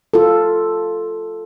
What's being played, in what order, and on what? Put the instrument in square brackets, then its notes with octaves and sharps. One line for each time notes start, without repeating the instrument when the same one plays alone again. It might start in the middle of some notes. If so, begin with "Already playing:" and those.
[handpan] F4 A4